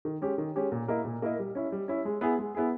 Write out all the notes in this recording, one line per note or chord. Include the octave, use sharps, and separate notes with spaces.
D#3
G#3 C#4 G4
D#3
G#3 C#4 G4
A#2
A#3 E4 A#4 D#5
A#2
A#3 E4 A#4 D#5
G3
C#4 E4
G3
C#4 E4
G#3
B3 E4 G#4
G#3
B3 E4 G#4